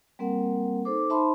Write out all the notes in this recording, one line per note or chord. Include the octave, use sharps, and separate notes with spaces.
G3 A#3 C4 A#4 F#5
D#4 A4 C5 D6
D#4 C5 E5 A5 B5 C6